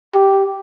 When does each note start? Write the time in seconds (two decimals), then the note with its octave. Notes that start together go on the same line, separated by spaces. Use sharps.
0.14 G4